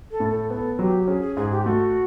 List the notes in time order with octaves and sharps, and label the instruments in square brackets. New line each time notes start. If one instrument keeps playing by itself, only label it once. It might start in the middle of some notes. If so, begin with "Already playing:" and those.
[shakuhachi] A4
[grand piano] A2
[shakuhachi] A4
[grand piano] B3 [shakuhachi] A4
[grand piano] F#3 [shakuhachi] G4
[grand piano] C#4 [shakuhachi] G#4
[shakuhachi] G#4
[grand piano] G#2 [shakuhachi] G#4
[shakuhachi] G4
[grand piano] A3 [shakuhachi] F#4